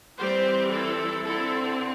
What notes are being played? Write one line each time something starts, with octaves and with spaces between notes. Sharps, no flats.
E3 G3 C4 G4 C5
E4 A4
D3 C4 E4 A4